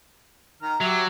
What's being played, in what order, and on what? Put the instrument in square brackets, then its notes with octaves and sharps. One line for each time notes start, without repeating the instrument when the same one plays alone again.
[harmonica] D#3 A#5 F6
[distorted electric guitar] F#3 [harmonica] G4 E5